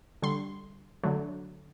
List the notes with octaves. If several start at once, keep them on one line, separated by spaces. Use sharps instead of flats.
D3 G3 C6
D3 F#3 A3